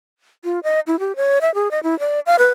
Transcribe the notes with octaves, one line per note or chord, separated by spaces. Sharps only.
F4
D#5
E4
G4
C#5
E5
G#4
D#5
E4
D5
F5
B4